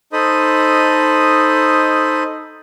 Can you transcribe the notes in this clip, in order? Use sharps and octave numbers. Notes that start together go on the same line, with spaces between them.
D#4 A4 C5 D#5 B5 D#6